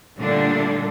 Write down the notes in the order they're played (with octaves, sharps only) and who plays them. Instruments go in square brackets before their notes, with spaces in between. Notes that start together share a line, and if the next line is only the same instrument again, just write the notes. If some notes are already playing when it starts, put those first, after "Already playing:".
[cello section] A#2 D3 G3 A3 D4